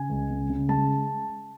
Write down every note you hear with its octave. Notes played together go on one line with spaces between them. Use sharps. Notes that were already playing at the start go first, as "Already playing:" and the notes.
Already playing: C#3 G#5
C#2
C#3
C#3
G#3 A5